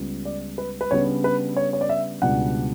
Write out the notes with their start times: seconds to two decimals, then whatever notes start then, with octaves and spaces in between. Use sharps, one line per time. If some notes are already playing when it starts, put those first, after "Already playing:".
Already playing: C#2 C#3 G3 B3
0.25 D5
0.58 B4
0.81 B4
0.91 C#3 G3 B3 D4 C#5
1.24 B4
1.57 C#5
1.73 C#5
1.81 D5
1.89 E5
2.22 C#2 B2 G3 B3 D4 F#5